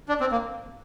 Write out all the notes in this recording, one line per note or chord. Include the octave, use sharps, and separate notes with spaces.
D4
C4
A#3